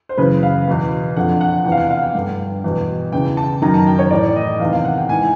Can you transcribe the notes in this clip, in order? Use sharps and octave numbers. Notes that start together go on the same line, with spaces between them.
C5
F#2 C#3 E3 B4
F5
E2 B2
F2 D3 F#5
F#5
E2 C3 E3 G5
F5
F#5
F5
F#5
G5
G2 D3
E2 B2
E2 C#3 E3 G5
A5
F#2 D#3 A#5
A5
G5
C#5
A2 E3 D5
D#5
E2 C3 D#3 F5
F5
F#5
G5
G#2 E3 G#5